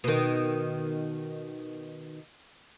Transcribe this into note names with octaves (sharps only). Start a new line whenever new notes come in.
B2 D#3